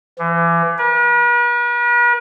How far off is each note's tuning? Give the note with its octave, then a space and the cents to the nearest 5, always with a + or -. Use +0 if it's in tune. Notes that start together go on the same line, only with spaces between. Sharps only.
E3 +35
B4 -45